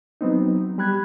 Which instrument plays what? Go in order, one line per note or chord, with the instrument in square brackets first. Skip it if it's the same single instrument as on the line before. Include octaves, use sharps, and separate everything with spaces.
[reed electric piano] F#3 B3 C4 D#4
G3 G4 B5 F#6 G#6